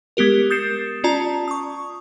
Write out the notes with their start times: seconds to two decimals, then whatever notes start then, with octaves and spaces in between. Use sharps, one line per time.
0.17 G#3 B3 G4 A#4
0.50 D#6 G6 A6 C7 C#7 E7
1.04 C#4 F4 D5 A5 A#5
1.48 C#6 D#6